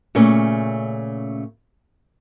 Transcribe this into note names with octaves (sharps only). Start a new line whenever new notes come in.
A#2 C#3 A3 C#4